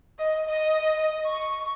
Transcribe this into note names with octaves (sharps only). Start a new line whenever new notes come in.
D#5
D#5
C#6